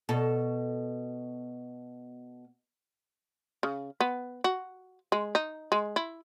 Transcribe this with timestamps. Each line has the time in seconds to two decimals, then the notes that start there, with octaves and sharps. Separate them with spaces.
0.09 B2 A4
3.63 C#3
4.00 B3
4.44 F#4
5.12 G#3
5.35 D#4
5.72 G#3
5.96 E4